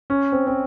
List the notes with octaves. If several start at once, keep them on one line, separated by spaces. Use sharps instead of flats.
C#4
C4
C4